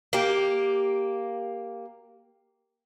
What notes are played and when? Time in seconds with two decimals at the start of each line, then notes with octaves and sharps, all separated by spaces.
0.13 A#3 G4